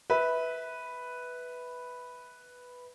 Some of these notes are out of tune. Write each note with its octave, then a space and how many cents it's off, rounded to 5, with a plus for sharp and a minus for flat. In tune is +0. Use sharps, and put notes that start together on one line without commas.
B4 +0 E5 -25